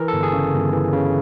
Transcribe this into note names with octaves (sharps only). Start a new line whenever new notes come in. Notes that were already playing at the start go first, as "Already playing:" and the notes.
Already playing: E3 A#4
G1 A4
G#4
C#3
G1
E3
C#3